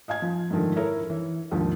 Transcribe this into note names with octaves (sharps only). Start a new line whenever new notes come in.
D#5 F5 G#5 G#6
F3
G#2 D3 D#3 F3 A3
E4 A4 A#4 C#5
E3
D#2 G#2 D3 D#3 F3